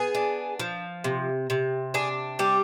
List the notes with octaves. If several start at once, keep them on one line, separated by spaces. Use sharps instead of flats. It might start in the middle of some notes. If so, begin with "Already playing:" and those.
Already playing: B3 G#4
D4
F3
C3
C3
D4 G#4
G3 G4